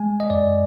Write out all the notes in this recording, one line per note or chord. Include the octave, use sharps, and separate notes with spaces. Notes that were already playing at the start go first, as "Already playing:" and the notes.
Already playing: G#3 G#5
D#5
F#2 D5